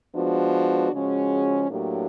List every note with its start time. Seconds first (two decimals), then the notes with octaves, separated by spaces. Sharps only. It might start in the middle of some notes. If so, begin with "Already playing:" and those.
0.14 F3 G#3 B3 D4 F#4
0.92 C#3 F3 G#3 C#4 F#4
1.69 A2 F#3 A#3 D4 G4